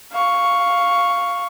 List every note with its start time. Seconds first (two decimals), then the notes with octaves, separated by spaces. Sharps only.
0.12 F5 C#6